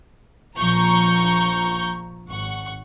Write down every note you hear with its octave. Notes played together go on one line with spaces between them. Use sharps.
A#1 F3 A#5 C#6 G6
G#1 F#5 C#6